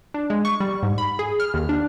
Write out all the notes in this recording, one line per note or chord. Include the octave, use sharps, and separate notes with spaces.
D4
G#3
C#6
G3
G#2
B5
G#4
F6
D#2
D4